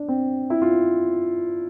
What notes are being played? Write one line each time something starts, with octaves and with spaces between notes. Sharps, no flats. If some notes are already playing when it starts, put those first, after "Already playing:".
Already playing: D4
C4
E4
F4